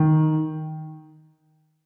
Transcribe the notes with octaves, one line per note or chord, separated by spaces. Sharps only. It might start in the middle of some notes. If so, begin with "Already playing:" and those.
Already playing: D#3